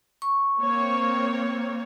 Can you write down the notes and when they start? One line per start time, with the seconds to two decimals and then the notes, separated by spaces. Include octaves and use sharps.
0.22 C#6
0.61 A#3 C4 C#5